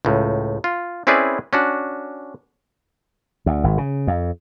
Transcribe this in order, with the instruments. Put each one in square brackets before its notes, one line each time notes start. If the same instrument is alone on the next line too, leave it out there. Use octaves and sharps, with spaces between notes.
[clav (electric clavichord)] C#2 A2
F4
C4 C#4 E4 G#4 B4 D5
C#4 D4 F#4
[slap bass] D2
G#1
C#3
F2